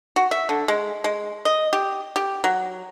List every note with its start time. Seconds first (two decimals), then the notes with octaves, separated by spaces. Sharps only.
0.16 F#4
0.31 E5
0.49 D3
0.68 G#3
1.04 G#3
1.45 D#5
1.73 G4
2.16 G4
2.44 F#3